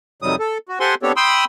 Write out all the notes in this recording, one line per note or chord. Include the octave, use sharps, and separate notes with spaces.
F2 C3 D#3 F#3 G3 D#6
A4
F#4
G4 A4 C5 F#5 G#5 C6
B3 C4 D4 G4 A4 C#5
G5 B5 C6 D#6 E6